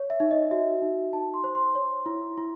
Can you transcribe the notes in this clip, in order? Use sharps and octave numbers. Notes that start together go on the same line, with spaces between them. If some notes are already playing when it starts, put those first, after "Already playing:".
Already playing: C#5
E5
D#4
D#5
F#4 E5
D#4
D#4 A5
C6
C5
C6
C#5
E4
E4